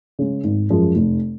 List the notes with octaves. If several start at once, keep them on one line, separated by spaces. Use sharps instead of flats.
C#3 G#3
G#1
F#2 F3 G#3
F1